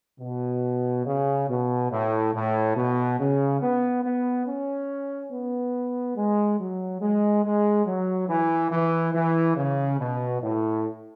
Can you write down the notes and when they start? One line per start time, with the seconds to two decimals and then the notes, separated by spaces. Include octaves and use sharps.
0.20 B2
1.06 C#3
1.49 B2
1.91 A2
2.34 A2
2.76 B2
3.19 C#3
3.61 B3
4.03 B3
4.47 C#4
5.31 B3
6.16 G#3
6.59 F#3
7.01 G#3
7.44 G#3
7.86 F#3
8.28 E3
8.72 E3
9.13 E3
9.56 C#3
9.99 B2
10.41 A2